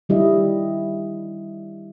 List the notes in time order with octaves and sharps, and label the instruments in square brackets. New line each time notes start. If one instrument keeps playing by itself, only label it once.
[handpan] D#3 G3 E4 D#5